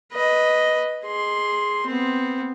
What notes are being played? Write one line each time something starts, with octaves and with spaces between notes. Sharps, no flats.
B4 D#5
G#4 C6
B3 C4